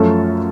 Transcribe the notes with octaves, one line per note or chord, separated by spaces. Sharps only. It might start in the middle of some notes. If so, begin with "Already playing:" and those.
Already playing: F#2 F3 A3 C#4 F4 A4